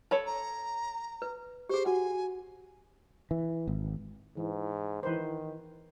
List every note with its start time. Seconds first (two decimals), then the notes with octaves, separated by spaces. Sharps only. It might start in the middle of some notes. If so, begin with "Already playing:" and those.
0.11 A4 C#5 A5 B5
0.26 A#5
1.22 B4
1.69 G4 G#4 C5
1.85 F#4 F#5 G#5
3.31 E3
3.68 G#1
4.37 G#2 E3
5.03 D#3 E3 B4 C5